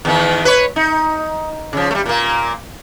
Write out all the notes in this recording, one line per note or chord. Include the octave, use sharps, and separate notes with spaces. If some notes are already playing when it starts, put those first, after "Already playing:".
E2 D#3
B4 C#5
D#4
C#3 F3
G3 A3
A#2 A#3